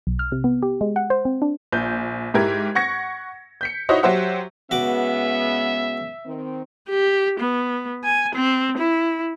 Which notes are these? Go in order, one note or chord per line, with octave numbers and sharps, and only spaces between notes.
B1
F6
C3
B3
G4
G#3
F#5
C5
C4
D4
A#1 G6
G#2 E4 G4 A#4 G#6
F#5 C#6 G#6 A#6 C#7
G6 B6 C#7
D#4 E4 F#4 C5 C#5 D#5
F#3 F#4 G4 C5 E5 F#5
C#3 G#3 B3 F#4 E5 D6
D#3 C4
G4
B3
G#5
C4
E4